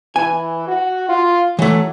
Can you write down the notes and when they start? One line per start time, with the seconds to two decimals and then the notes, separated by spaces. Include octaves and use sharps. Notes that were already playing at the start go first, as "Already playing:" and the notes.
0.16 E3 G#5
0.68 F#4
1.09 F4
1.59 E3 F#3 A3